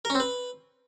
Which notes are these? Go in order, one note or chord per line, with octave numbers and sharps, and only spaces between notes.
A#4
C#4
C4
B4